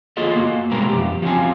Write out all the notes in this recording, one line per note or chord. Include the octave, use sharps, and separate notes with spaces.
A#3 F4 G#4 A4 D#5
A#3 F#4
B2 G3 G#3 A#4 B4 A#5
F2 G4
F3 C4 C#4 G#5